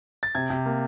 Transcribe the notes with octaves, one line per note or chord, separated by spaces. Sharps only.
A6
C3 G#6
C3
A#3